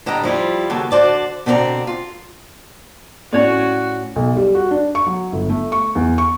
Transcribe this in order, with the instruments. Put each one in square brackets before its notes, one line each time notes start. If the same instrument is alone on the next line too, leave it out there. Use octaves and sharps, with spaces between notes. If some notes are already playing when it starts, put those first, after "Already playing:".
[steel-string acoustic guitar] A2 D3 G3 D#5 A#5
F3 G3 E4 F4
D#2 C#3 F#3 A4
D3 F#4 C5 D5 A5
B2 D3 C4 A4 D5 A#5
F4
[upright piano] A2 [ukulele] C#4 C#5 D5 [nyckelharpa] F#4
[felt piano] B1
G3
F#4
D4
C#6
F#3
G1
A3
C#6
E2
C#6